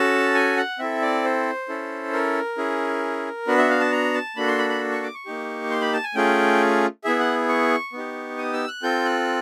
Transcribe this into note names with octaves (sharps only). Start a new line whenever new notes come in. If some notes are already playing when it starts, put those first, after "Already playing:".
Already playing: C#4 F#4 A4 A5
G#5
F#5
C4 E4 A4 E5
D5
C5
C#4 E4 A4
A#4
C#4 E4 G#4
B3 D4 F#4 B4
E5
F5
A5
A#5
A5
A#3 D4 F#4 A4 B5
C6
B5
B5
C#6
D6
C#6
A#3 D#4 G4
C6
B5
A5
G#5
A3 C#4 F4 G#4 G5
B3 E4 G#4 E5
F#5
C#6
B3 D#4 G4
D#6
E6
F#6
C4 F4 A4 G6
F#6